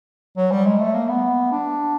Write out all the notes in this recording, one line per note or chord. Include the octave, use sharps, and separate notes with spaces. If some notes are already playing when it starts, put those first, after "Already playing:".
F#3
G3
G#3
A3
A#3
B3
D4